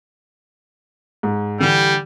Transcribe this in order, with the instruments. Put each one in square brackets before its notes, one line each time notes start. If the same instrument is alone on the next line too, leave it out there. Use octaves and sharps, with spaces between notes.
[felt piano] G#2
[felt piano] D3 E3 G4 [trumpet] G3